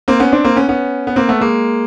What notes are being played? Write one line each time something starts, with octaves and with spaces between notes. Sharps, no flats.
A#3 C4
B3 C#4
C4 D4
A#3 C4
B3 C#4
B3 C#4
B3
A#3 C4
A3 B3
G#3 A#3